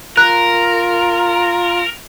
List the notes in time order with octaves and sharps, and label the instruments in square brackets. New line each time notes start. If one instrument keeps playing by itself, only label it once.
[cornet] F4 [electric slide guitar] A#4 [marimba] F#6